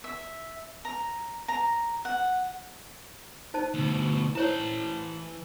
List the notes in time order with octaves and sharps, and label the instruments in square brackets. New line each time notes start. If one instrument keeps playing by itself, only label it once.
[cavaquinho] E5
A#5
A#5
F#5
[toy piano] D#4 C5 A5
[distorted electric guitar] D2 B2
[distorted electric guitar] E3 A5 [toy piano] E4 C5 C#5